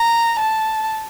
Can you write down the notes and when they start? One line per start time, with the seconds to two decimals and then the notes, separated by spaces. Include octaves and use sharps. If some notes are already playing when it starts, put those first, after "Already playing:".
Already playing: A#5
0.39 A5